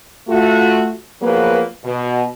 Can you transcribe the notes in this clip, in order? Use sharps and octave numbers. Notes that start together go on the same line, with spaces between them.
A3 F4 F#4
F3 F#3 A#3 B3 G#4 B4
B2